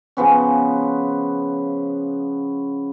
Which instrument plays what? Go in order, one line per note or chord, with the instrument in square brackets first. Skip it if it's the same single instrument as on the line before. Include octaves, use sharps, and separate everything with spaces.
[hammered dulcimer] C#3 F3 B3 C#4